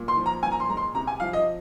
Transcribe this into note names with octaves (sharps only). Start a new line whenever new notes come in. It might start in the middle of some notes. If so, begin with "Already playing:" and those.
Already playing: A#2
C6
F3
A#5
A#2 G#5
A#5
C6
G#3 A#5
C6
C3 A#5
G#5
F3 F5
D#5